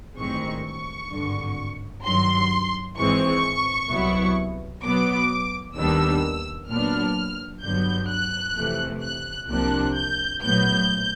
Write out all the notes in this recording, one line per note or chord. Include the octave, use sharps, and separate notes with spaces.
A1 G2 D#3 G#3 C4 C#6
C#6
G#1 G2 D3
G2 D#3 F#3 C6
G#1 G#2 E3 G#3 C4 C#6
C2 B2 F#3 B3 E4
B2 F#3 B3 D6
D#2 D#3 G3 B3 D4 E6
A#2 F#3 B3 D4 F6
G1 G2 D3 F#3 B3 G6
F#6
F2 C3 E3 A3
F#6
C2 C3 F3 A#3 D4 F#6
G6
A#1 A2 F#3 B3 G6